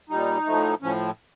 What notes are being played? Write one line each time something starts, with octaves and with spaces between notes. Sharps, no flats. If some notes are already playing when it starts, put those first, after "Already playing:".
A#2 G3 D#4
A2 F3 A3
A2 F3 C#4